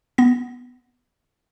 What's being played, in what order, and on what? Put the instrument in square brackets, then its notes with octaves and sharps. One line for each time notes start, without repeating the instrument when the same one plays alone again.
[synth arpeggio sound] B3 A#6